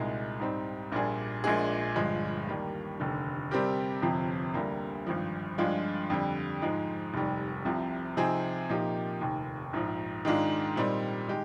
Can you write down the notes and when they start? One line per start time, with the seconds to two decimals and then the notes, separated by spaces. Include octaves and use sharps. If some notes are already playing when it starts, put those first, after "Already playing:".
Already playing: C2 A#2 G#3 D#4
0.40 G#2 G3 C4 D#4
0.92 A#1 A#2 G3 D4 G#4
1.44 A#1 A#2 G#3 D4 G#4
1.95 G1 G2 F3 G#3
2.48 D#2 D#3 G3 A#3
3.00 F1 D#2 D3
3.51 C3 G3 C4 G4 A#4
4.02 G1 F2 C3 F3
4.54 D2 D3 G3 A#3
5.07 G#1 G2 F3
5.58 G2 F3 G#3 D4 F4
6.10 F2 D3 G3
6.62 G#2 F3 G#3 D#4
7.14 F1 D#2 D#3 G3
7.65 C2 C3 F3
8.17 C3 F3 C4 D#4 G#4
8.69 A#2 F3 A#3 D#4 G4
9.21 F1 D#2 D#3
9.73 A#1 G#2 F3
10.25 G#2 D#3 G#3 D4 F4
10.76 A#2 G3 C4 D#4
11.28 D#3 G#3 G4